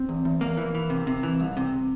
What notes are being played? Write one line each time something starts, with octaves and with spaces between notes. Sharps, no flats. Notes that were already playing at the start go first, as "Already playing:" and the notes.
Already playing: C4
E2
E2
E2 A#3
E3
E3
C3
C3
E3
C2
C3